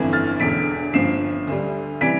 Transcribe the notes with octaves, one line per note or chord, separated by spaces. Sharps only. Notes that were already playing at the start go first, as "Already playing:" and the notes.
Already playing: G1 F2 E3 A3
F6 A6
E1 E2 D3 B6 D7
G1 G2 F3 C7 E7
D2 D3 G3
C3 E3 G3 B6 D7